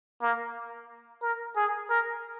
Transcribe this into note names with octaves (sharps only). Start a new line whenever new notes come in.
A#3
A#4
G#4
A#4